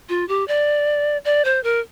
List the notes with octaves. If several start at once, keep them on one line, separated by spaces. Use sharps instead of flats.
F4
G4
D5
D5
C5
A#4